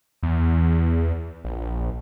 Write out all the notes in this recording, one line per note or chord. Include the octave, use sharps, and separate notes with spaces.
E2
A#1